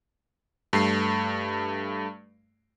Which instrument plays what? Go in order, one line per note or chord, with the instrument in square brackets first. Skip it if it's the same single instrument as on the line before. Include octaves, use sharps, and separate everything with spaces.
[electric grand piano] G2 A3 C7